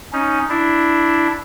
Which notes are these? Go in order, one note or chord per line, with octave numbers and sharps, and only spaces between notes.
C#4 D#4
D4 E4